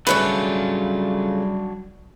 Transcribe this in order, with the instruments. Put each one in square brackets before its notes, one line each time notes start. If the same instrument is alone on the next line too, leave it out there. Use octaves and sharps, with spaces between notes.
[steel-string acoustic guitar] C#3 A3 F4 [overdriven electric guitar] F#3 D4 [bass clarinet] G3 [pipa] B4 C#5